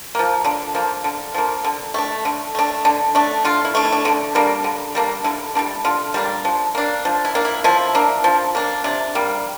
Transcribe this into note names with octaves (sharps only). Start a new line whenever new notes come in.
F3 A#3
D3 D4
F3 A#3
D3
F3 A#3
D3
A3 D4
D3
A3 D4
D3 D4
A3 D4
D3 F4
E4
A3 D4
E4
D4
D3 D4
G3 A#3 D4
D3
G3 A#3 D4
D3 E4
G3 A#3 D4
D3 F4
G3 A#3 D4
F3
A#3 D4
F3
E4
A#3 D4
E4
F3 E4
A#3 D4
F3
A#3 D4
C3 D4
G3 A#3